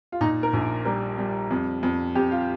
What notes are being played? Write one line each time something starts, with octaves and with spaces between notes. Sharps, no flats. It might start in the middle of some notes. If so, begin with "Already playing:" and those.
F4
A#2 D#4
A#4
A#1
G3 A#4
G3
F2
F2
F2 G4
F4